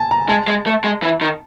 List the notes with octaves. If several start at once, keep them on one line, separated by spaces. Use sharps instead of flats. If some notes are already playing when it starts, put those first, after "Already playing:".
Already playing: G#5 A5
A#5
G#3 A5
G#3
A3
G#3
E3
D#3